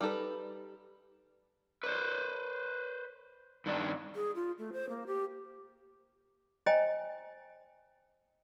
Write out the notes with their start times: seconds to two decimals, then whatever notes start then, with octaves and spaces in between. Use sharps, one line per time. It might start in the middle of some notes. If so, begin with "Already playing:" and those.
0.01 G3 D#4 A4 B4
1.83 B4 C5
3.66 G2 D#3 D4
4.16 G#4
4.35 F4
4.58 A3
4.73 C5
4.90 A#3
5.07 G4
6.66 C5 D#5 G5 G#5 A#5